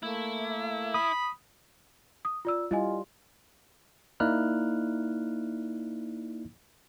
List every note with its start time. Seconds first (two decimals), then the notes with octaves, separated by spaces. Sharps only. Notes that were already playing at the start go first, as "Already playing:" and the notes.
0.03 A3 A#3 E4
0.94 B5 D#6
2.25 D#6
2.45 F4 D5 E6
2.71 G3 E4 F4 D#5 G#5
4.20 A#3 D#4 E4 D5 F6 F#6